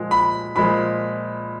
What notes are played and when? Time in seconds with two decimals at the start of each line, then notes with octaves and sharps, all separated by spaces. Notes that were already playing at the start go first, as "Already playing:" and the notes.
Already playing: A#2 F3 G#3
0.11 B5
0.56 A#2 F3 G#3 B5